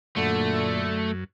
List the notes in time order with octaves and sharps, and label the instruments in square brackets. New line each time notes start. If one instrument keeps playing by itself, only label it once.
[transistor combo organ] F#2 [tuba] A#2 [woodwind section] D3 [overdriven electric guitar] A3